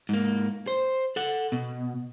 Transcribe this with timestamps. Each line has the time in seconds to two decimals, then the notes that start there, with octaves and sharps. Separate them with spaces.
0.09 G#2 A#3
0.67 C5
1.16 A4 F#5
1.52 B2